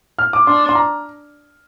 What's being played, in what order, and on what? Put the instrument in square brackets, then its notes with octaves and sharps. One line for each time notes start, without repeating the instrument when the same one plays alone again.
[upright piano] F6
D6
[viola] D4 [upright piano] C6
[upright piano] C6
A#5